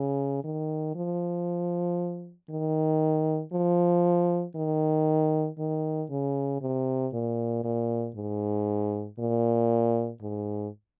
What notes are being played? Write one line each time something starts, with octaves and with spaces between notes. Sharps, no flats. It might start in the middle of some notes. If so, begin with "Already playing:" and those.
Already playing: C#3
D#3
F3
D#3
F3
D#3
D#3
C#3
C3
A#2
A#2
G#2
A#2
G#2